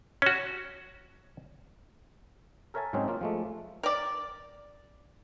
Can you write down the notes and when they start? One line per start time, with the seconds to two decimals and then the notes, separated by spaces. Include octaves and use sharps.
0.22 C#4 F#4
2.74 A4 A#4 C#5 E5 G#5 A5
2.93 G#2 F#3 G#3 C4 C#4 D#4
3.08 A#3 F4
3.21 F3 G#3 A3
3.83 A#4 D5